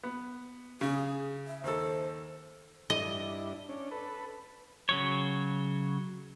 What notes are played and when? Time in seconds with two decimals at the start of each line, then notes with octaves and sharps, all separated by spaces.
0.03 B3
0.81 C#3 G#4
1.47 E5
1.64 D#2 A4 C5
2.90 G2 D4 E4 D#5
3.69 C#4 D4
3.91 A4 B4
4.89 C#3 F#3 C#5